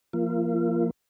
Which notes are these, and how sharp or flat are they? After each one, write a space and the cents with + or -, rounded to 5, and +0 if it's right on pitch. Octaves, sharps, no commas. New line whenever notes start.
F3 -15 A#3 +0 F4 -40